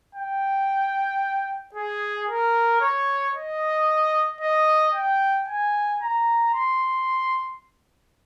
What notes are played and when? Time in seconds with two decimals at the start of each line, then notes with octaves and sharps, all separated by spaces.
0.15 G5
1.75 G#4
2.29 A#4
2.81 C#5
3.35 D#5
4.41 D#5
4.95 G5
5.48 G#5
6.02 A#5
6.54 C6